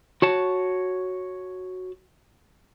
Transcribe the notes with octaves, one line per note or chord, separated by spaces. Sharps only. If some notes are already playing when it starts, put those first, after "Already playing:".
F#4 C#5 A5